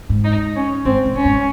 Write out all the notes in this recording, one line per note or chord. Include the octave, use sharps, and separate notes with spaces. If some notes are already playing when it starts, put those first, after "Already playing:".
G#2
D#4
C#4
G#2 C4
A#2
C#4
G#2